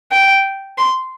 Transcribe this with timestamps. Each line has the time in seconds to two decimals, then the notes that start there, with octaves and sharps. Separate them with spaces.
0.12 G5
0.78 C6